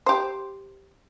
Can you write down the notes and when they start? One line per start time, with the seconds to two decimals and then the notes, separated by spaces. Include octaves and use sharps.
0.06 G4 C5